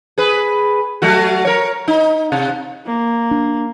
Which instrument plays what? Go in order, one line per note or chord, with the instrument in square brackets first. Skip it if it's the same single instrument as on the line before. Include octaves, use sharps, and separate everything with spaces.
[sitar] G#4 B4
F#3 A3 F#4
A#4 C#5
D#4
C3
[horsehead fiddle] A#3
[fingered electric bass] D4